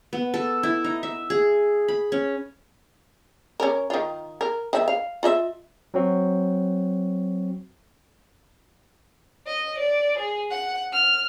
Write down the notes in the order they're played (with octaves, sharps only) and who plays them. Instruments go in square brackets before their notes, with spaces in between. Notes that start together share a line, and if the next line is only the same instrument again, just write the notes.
[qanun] B3
A4
E4
D#4
E5
G#4
B5
C#4
[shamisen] C#4 A#4
D#3 F4
A#4
D#3 E5
F5
F4 D#5 E5
[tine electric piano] F#3 C4 F#4
[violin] D#5
D5
G#4
F#5
F6